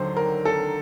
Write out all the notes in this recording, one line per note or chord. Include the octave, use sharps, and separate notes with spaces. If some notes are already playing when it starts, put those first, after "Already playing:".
Already playing: D#2 D3 F#3 C5
A#4
A4